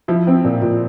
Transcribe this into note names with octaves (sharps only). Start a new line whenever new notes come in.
F3 E4
C4
A#2
A#2